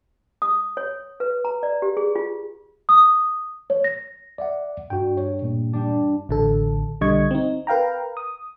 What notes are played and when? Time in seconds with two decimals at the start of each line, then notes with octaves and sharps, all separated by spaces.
0.42 D#6
0.77 C#5
1.20 B4
1.45 A#5
1.63 D5
1.82 G4
1.97 G#4
2.16 F4
2.89 D#6
3.70 C#5
3.84 A#6
4.38 D5 E5 F#5
4.90 G2 F#4 G5
5.17 C#5
5.42 A#2 A#3
5.73 G3 D4
6.29 A1 D3 A4
7.01 B1 D3 G3 D#5 C#6 G#6
7.31 C4 D#4
7.67 A#4 B4 F5 G5 A#5
8.17 D#6